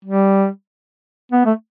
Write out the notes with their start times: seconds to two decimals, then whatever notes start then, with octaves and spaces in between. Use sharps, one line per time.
0.05 G3
1.32 B3
1.45 A3